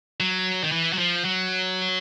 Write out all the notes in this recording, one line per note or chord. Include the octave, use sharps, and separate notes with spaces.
F#3
D#3
E3
F#3
F3
F#3